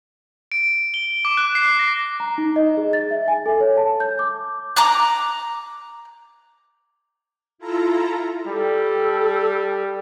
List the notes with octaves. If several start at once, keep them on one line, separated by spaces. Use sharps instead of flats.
D7
G7
D6
F#6
C7
A#6
A#5
D#4
D#5
G#4
A6
E5
G#5
A4
C#5
A5
G6
D6
A#5 D6 F#6
E4 F4 A4 A#5
G3 A4